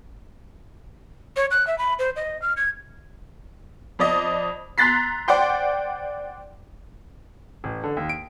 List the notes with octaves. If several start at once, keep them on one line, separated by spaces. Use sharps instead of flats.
C#5
F#6
E5
B5
C5
D#5
F6
G#6
F2 D5 D#5
A#5 C6 F#6 A6 B6 C7
C5 D5 F#5 G5 C6
A1
D3
D#2
D7